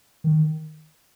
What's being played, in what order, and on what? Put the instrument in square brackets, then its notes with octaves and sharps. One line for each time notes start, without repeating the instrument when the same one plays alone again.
[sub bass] D#3